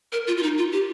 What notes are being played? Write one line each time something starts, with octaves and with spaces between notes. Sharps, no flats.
A#4
F4
F4
D#4
F4
G4